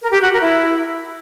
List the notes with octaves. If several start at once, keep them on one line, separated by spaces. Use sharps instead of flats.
A#4
G4
F#4
A#4
E4